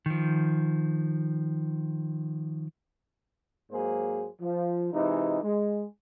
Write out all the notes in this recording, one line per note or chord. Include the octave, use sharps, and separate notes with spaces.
D#3 F3
G#2 F#3 A#3 G#4 C5
F3
C3 E3 G#3 D#4
G#3